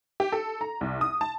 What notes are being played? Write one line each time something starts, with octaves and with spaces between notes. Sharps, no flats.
G4
A4
A#5
C2
D#6
A5